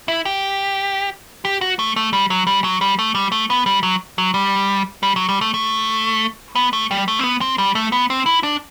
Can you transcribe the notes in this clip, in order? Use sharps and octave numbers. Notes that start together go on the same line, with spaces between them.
E4
G4
G4
F#4
A3
A3
G3
F#3
G3
F#3
G3
A3
G3
A3
B3
G3
F#3
F#3
G3
G3
F#3
G3
A3
A3
B3
A3
G3
A3
C4
B3
C4
G3
A3
B3
C4
E4
D4